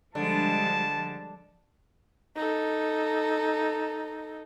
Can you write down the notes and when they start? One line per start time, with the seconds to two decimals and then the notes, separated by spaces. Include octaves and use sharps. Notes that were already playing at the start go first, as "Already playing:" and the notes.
0.15 D3 F3 G3 G#3 A5
2.36 D#4 A4